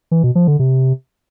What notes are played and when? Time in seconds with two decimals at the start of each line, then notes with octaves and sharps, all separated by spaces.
0.11 E3
0.23 B2
0.35 F3
0.47 D3
0.59 C3